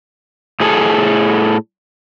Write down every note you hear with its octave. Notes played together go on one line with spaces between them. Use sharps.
A2 G#4 A4